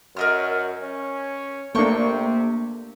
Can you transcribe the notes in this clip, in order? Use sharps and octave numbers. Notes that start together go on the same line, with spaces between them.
F#2 A#4 D#5 F6
C#4
C3 A3 A#3 D4 G5 C#6